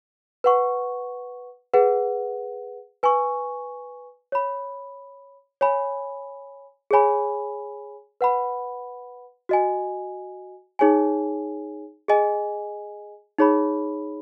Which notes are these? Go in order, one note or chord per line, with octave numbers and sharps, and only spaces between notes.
B4 F#5 C#6
G#4 B4 F#5
B4 G#5 C#6
C#5 B5
C#5 G#5 B5
G#4 C#5 G#5 B5
B4 F#5 B5
F#4 D#5 G#5
D#4 G#4 C#5 G#5
G#4 D#5 G#5
D#4 G#4 C#5 B5